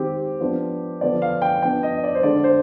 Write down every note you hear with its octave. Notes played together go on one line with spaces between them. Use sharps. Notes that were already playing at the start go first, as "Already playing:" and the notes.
Already playing: D#3 G#3 C4 G4
F3 B3 D4
D3 F3 B3 D4 D5
F5
G5
F3 B3 D4 G5
D#5
D5
C5
D3 G#3 D4 D5
C5